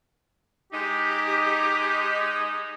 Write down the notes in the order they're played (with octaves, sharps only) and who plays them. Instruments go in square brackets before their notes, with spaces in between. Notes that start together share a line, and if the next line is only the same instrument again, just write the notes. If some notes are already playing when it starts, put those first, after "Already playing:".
[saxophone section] G#3 D#4 [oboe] G4